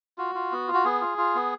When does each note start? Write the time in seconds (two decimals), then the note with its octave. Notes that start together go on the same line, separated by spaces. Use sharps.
0.18 F4 F#4
0.35 F4
0.52 B3
0.68 F4
0.74 F#4
0.85 B3 G#4
1.01 F4
1.18 F4
1.35 B3